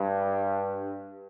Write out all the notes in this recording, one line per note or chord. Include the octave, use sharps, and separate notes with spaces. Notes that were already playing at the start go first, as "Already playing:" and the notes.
Already playing: G2